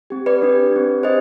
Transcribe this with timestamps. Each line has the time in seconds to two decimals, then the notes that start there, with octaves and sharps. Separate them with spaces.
0.10 C4 G4
0.26 B4 D5
0.42 D4 G4
0.72 C4 G4
1.03 D4 G4 C5 D#5